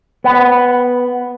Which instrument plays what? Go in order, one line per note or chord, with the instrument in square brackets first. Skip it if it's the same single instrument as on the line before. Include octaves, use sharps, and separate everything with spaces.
[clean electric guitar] B3